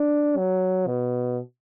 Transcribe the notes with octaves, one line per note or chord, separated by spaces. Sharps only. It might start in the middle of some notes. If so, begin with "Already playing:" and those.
Already playing: D4
F#3
B2